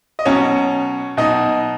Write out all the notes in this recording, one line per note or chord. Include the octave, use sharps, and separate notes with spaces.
D#5
B2 F#3 C#4 C#5
B2 F#3 D#4 D#5